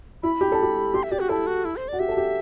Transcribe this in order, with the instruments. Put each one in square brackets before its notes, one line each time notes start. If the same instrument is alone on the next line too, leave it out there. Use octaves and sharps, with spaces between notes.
[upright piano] E4 [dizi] B5
[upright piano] G4
A4
G4
[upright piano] G4 [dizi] C6
[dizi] E5
[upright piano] G4 [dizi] D5
[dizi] F#4
[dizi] E4 [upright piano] A4
[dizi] F#4
E4
C5
[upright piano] F#4 [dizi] D5
[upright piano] G4 [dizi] E5
[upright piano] A4
G4